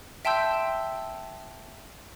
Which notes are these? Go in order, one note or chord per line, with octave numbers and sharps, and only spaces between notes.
E5 G5 A5 C6 E6 G6